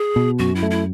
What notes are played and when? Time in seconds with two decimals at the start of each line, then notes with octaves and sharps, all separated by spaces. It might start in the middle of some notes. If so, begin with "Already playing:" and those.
Already playing: G#4
0.16 B2
0.39 F#2 F#4
0.55 E4
0.63 A3
0.71 E4